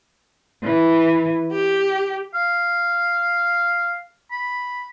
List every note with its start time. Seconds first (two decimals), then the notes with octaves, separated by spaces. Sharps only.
0.63 E3
1.51 G4
2.34 F5
4.32 B5